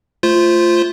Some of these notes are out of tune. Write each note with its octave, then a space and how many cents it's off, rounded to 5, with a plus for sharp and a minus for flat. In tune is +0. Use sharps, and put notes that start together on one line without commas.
A3 +0 F4 -10 C5 +0